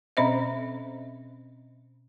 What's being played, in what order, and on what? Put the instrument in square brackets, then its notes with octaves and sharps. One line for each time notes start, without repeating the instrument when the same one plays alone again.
[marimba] B2 C4 C#4 C5 D#5 E5